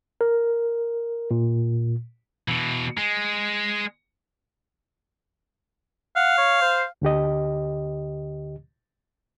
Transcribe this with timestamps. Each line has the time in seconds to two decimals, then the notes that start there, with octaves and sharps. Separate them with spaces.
0.21 A#4
1.31 A#2
2.48 B2 E3
2.98 G#3
6.16 F5 F#5
6.38 C#5
6.62 C5
7.02 D2 D3 G4 D#5